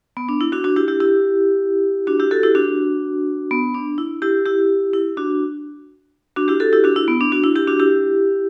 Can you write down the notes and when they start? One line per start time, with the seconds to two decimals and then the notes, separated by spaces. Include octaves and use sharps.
0.17 B3
0.29 D4
0.41 E4
0.52 D4 F#4
0.64 D4 F#4
0.76 E4 G4
0.88 E4 G4
1.00 E4 G4
2.07 D4 F#4
2.20 E4 G4
2.31 F#4 A4
2.43 E4 G4
2.55 D4 F#4
3.51 B3
3.75 D4
3.98 E4
4.22 E4 G4
4.46 E4 G4
4.94 E4
5.17 D4 F#4
6.36 D4 F#4
6.48 E4 G4
6.60 F#4 A4
6.73 E4 G4
6.84 D4 F#4
6.96 E4
7.08 B3
7.21 D4
7.32 D4 F#4
7.44 E4
7.56 E4 G4
7.67 D4 F#4
7.80 E4 G4